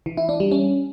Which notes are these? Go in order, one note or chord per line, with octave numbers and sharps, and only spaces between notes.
E3
E4
D4
G3
C#4